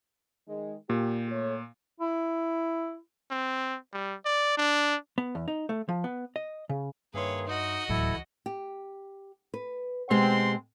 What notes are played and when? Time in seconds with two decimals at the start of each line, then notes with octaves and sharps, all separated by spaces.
0.48 D#3 G#3
0.90 A#2 G4
1.31 A3 C#5
2.00 E4
3.31 C4
3.93 G3
4.25 D5
4.57 D4
5.18 B3
5.35 E2
5.48 D#4
5.69 A3
5.89 F3
6.04 B3
6.36 D#5
6.69 C#3
7.14 G2 D#3 A#3 G#4 B4 C#5 E5 C6
7.47 D#4 F#4 D#5
7.89 D1 C#2 A2 E3 F#3 E4 A4
8.46 G4
9.54 B4
10.11 B2 G#3 C4 G4 C6